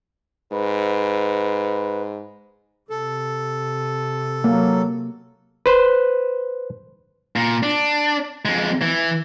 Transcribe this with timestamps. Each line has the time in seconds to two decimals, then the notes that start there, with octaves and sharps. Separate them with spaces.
0.52 G#2 B4
2.90 C3 A4
4.44 F#3 A#3
5.66 B4 C5
7.36 A#2
7.63 D4
8.45 F2 G#3
8.82 E3